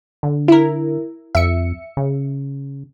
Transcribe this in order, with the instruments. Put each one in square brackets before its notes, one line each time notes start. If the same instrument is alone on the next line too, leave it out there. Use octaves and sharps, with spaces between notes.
[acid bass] D3
[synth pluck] E4 A#4
[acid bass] F2 [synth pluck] E5 C#7
[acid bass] C#3